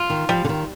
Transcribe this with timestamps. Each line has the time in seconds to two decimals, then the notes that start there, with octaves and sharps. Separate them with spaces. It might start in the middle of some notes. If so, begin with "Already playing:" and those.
Already playing: F4
0.10 D#3
0.29 F3 G3
0.44 D3
0.49 D#3